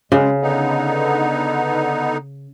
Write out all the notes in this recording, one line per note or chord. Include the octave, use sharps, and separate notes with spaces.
C#3 G#3
D3 B3 D#4